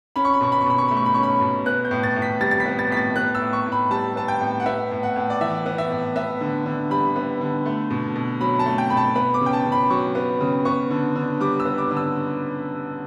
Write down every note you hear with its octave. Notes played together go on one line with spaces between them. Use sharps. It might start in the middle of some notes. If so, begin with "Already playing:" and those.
C#4 B5
C#6
B5
B2 C#6
B5
C#6
B2 B5
C#6
A3 B5
C#6
B5
C#4 C#6
B5
B2
B3 F#6
G6
A2
A6
A2
B6
G3 A6
A6
B6
B3
A6
A2 B6
A6
B3 F#6
E6
A2
C#6
A2
B5
G3 A5
B3 A5
G5
A2
F#5
B3 E5
A2
F#5
A2
D5
E3 E5
B3
E5
A2
B3 E5
D3
D3
G3 B5
B3
D3
A3
B2
B2
F#3 B5
A5
A3
G5
B2 B5
A5
B3 B5
D6
C#3
G5
A5
C#3
B5
F#3 C#6
B3
C#3
B3 C#6
D3
D3
G3 D6
E6
B3
D6
D3
E6